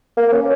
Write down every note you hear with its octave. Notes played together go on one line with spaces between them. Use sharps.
A#3
A#3
C#4